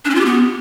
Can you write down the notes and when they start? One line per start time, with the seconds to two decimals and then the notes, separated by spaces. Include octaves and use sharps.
0.05 D4
0.10 C#4
0.15 F4
0.20 G4
0.25 B3